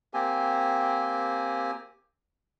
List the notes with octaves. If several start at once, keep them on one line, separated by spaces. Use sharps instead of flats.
A#3 C4 G4 G#5